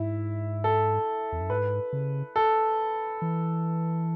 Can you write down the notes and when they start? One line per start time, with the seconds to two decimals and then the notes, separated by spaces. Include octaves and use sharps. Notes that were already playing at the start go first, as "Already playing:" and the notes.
Already playing: G#2 E4
0.64 A4
1.32 E2
1.41 F#2
1.50 G#2 B4
1.93 C#3
2.36 A4
3.22 E3